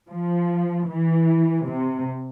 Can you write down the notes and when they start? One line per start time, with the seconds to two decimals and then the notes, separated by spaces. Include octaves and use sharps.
0.09 F3
0.88 E3
1.67 C3